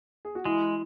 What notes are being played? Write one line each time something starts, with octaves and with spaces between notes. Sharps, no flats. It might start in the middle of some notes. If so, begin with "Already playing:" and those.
G#4
F#4
E3 G#3 E4